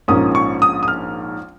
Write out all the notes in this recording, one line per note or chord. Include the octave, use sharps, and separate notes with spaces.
A#1 G#2 F3 A#3 C#4 D#6
C#6
D#6
D#6
F6